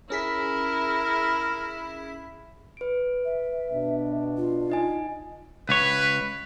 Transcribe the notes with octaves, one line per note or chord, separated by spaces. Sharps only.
C#4 E4 G#4 A#4 B6
B4 D7
E5
B2 D4
F4
D#4 D#5 G#5
C#2 B4 C#5